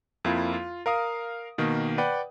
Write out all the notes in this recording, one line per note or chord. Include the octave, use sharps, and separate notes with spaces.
F2 A#3 E4 F4
F4
A#4 F5 D#6
B2 D#3 A#3
B4 D5 F#5 G5